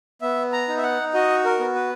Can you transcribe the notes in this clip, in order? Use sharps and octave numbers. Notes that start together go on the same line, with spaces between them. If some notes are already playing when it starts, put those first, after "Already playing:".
B3 E5
A#5
D#4
E5
F#5
F#4 D#5
A#4
B3
B4